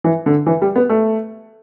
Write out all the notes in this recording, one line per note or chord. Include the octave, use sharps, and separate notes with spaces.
E3
D3
E3
G3
B3
A3